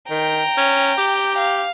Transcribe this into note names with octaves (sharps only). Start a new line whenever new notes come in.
D#3 G5 A#5
C#4
G4
F5